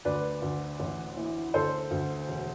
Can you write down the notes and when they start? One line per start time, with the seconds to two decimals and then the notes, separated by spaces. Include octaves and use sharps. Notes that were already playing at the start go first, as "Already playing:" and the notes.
0.05 D2 B4 D5
0.42 D2
0.80 A1
1.16 E3
1.54 D2 A4 C5
1.91 D2
2.28 E1